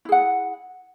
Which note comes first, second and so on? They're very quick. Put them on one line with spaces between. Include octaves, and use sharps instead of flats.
E4 G#4 F#5